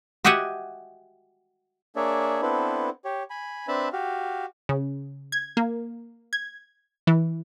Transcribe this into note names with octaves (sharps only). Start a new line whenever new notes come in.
F#4 G4 D#5 E5 F#5 G#5
A#3 D4 G#4 C#5 D5 E5
B3 C4 D4 E4 A4 B4
G4 C#5
G#5 B5
C4 D4 B4 E5 A5 B5
F#4 G4 F5
C#3
G#6
A#3
G#6
E3